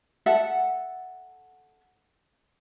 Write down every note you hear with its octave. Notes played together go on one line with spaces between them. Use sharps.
A4 E5 F#5